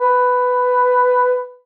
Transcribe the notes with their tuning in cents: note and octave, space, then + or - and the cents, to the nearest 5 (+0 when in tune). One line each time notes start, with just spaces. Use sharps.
B4 +10